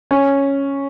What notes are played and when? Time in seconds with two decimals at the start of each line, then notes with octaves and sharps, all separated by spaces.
0.11 C#4